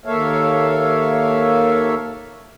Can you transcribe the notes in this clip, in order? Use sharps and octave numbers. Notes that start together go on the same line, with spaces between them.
D#2 A#3 A4 C#5 E5 F5